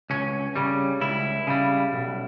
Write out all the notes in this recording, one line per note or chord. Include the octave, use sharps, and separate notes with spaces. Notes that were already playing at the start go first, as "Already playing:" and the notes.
C#2 C#4
C#3 G3
C#2 E4
C#3 G3
B1